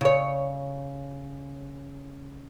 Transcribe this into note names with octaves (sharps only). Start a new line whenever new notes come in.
C#3 C#5